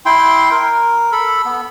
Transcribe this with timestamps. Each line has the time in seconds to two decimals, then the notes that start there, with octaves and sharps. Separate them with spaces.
0.06 E4 G5 C6
0.52 A#4
1.12 A4 B5
1.46 B3